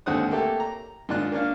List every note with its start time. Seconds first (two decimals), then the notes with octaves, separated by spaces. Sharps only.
0.06 D#2 G#2 D3 C4 F#5 D#6
0.31 A3 A#3 G4 A4
0.60 A#5
1.09 G#2 D#3 D4 F4 F#6
1.32 A#3 C#4 D4 F5